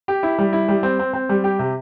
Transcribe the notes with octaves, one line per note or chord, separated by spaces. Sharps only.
G4
E4
G3
E4
G3
C4
C4
C4
G3
G4
C3